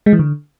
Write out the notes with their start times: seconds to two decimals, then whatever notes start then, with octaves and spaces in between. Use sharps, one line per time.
0.06 G#3
0.13 E3
0.19 D3